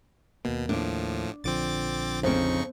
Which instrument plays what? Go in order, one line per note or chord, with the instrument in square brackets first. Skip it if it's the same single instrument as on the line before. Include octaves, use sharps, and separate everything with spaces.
[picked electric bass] D#2 A#3 [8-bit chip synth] B2
[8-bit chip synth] A2 F3 [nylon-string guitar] D4
[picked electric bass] A#1 D3 F3 [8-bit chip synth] C4 D6 A6
[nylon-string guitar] F2 C4 [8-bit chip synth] C#3 D#4 C#6